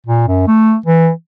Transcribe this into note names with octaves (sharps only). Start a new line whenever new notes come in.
A#2
F#2
A3
E3